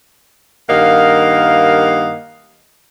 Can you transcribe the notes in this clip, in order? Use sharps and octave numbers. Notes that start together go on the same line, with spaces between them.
G2 D#3 A#3 D#5 F5 F#5